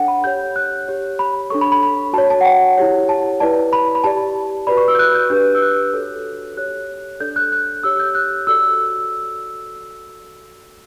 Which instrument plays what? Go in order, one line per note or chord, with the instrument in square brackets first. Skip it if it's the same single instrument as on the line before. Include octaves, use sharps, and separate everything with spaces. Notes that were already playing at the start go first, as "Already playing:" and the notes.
Already playing: [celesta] D4 A4 C#5 F#5 G5
B5
G4 C#5 G6
F#6
G4 C#5
B5
D4 A4 C#5 C#6
B5
B5
B5
F#4 C#5 A5
A5
F#5
G5
E4 G4 C#5
A5
E4 B4 D5 A5
B5
B5
G4 D5 A5
F#4 B4 D5 B5
C#6
E6
G6
F#6
G6
D4 G4 B4 G6
E6
F#6
F#4 A4 C#5
G4 C#5 F#6
D4 A4 D5 G6
F#6
F#6
G4 C#5 E6
G6
F#6
F#4 A4 D5 E6